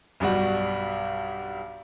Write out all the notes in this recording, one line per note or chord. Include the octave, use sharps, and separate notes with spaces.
B1 G2 G3 F#4